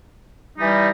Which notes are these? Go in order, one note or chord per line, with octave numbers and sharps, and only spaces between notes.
E3 G3 D#4